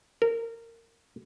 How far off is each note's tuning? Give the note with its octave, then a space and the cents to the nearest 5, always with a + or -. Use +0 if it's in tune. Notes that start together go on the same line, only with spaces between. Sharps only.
A#4 -20